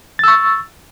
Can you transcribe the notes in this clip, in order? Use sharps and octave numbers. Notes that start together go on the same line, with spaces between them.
C#6 E6 A6